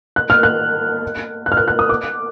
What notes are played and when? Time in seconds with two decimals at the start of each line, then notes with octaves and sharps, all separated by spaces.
0.16 F#6
0.30 F6
0.43 F#6
1.46 F#6
1.52 F6
1.57 F#6
1.68 F#6
1.79 D#6
1.89 D6